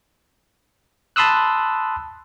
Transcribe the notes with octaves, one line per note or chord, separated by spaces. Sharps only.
A5 B5 C6 D#6 E6 F#6